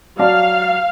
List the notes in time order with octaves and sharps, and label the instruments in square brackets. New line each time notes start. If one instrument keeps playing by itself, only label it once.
[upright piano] F#3 D5 A5 [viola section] F5